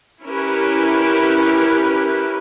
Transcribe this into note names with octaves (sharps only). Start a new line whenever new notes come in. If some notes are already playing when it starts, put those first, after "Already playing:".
C#4 E4 G4 A#4 B4